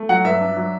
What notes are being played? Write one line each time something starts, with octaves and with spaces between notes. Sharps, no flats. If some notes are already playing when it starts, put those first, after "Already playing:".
Already playing: A3
F#3 F#5
G2 E5
D4
F#3